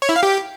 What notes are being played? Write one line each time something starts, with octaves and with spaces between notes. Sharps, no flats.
C#5
E4
F5
G4